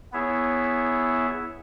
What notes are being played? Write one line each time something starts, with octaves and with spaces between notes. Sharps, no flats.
B3 E4 G#4 C#5 E5